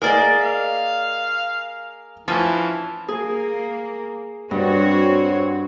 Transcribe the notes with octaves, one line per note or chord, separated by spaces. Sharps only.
A#3 G#4 A#4 D5 D#5
F5
E3 F3 C#4
A#3 G#4
G2 C4 F#4 C#5